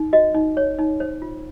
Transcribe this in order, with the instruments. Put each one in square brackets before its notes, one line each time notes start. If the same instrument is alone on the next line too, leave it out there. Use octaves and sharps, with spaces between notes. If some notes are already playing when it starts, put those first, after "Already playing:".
Already playing: [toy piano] D#4
F#4 D#5
D#4
C#5
D#4
C5
F4